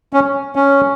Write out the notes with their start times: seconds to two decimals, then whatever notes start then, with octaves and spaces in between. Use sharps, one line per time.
0.13 C#4
0.56 C#4